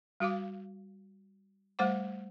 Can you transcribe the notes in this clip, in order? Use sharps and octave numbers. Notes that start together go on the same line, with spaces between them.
G3 F#4 F5 D6
G3 A3 C5 F#5 D6